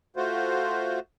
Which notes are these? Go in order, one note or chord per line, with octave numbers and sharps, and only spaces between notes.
A3 F4 F#4 C5